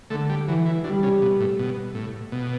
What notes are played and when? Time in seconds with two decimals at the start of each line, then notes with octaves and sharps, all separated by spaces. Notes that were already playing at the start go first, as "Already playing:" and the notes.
0.10 D3 A3
0.30 G3
0.48 E3 F#3
0.66 E3
0.84 D3 G3
1.03 C#3
1.22 B2
1.40 A2
1.59 B2
1.95 A2
2.32 B2